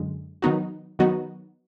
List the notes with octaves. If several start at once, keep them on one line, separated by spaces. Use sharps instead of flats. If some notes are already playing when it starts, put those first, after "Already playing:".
Already playing: F#2 D3 G#3
D#3 F#3 B3 D#4 F#4
D#3 F#3 B3 D#4 F#4